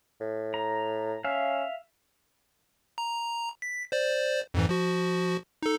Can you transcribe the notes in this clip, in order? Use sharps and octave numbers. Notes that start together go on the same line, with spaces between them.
A2
A#5
C#4 E5 F5
A#5
B6
C5 D5
F2 G#2 E3
F3 F#4
D#4 A4